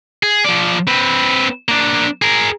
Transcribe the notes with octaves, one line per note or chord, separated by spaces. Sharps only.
G#4
F3 D5
C4 B4
A#3 D4
G#4 A#4